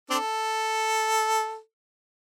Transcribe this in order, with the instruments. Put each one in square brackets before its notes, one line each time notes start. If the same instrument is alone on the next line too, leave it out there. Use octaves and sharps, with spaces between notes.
[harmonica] C4 D4 A4